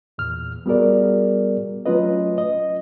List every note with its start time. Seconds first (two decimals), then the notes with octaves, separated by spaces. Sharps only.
0.18 E2 A#2 F6
0.66 G3 B3 F#4 G#4 A#4 D5
1.86 F#3 A3 C#4 F4 B4 D#5
2.38 D#5